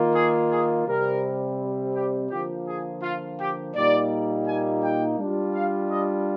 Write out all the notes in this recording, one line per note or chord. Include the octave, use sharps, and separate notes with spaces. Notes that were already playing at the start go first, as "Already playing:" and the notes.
Already playing: D#3 A#3 F4
G#4
G#4
C3 G3 C4 A#4
G4
D3 F3 A#3 F4 G4
G#4
F4
G4
A#2 G3 A#3 D#4 D5
G#5
G5
G3 D4 F4
F5
D#5